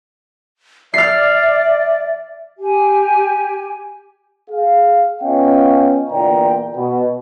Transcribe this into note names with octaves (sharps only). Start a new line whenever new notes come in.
D5 E5 F6 C7
G4 G#5
G#4 F5
B3 C#4 F4 D#5 F5 G5
E2 A#2 D3 D5 G5 A#5
B2